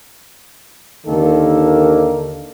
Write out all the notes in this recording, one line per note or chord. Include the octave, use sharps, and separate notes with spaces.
D#2 D3 D#3 A#3 A4